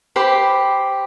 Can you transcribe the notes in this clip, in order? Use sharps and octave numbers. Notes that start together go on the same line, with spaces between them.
G4 C5 B5